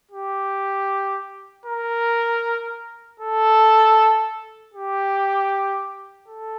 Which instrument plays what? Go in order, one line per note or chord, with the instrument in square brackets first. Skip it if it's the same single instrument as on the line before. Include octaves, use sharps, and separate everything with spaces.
[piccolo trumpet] G4
A#4
A4
G4
A4